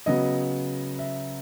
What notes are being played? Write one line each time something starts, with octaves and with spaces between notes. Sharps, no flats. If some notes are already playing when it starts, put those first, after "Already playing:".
C#3 F#3 B3 D#5
E5